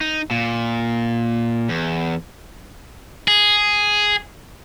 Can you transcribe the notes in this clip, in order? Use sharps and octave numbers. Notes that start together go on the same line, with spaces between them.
D#4
A#2
E2
G#4